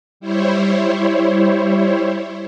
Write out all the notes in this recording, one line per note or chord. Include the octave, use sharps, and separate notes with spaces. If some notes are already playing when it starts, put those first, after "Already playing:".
G3 E4 C5 C#5